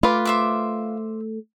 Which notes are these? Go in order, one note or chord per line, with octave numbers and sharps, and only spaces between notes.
A3 F4 B4 D6
C5 E5 D6